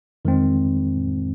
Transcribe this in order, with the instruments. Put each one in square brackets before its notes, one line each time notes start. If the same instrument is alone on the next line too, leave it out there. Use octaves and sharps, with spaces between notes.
[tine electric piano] F2 D#3 G#3 C4